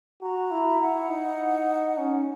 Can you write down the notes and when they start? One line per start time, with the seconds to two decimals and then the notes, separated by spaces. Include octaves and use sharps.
0.21 F#4 A#5
0.51 E4
0.70 E5
0.80 E4 F#5
1.09 D#4
1.98 C#4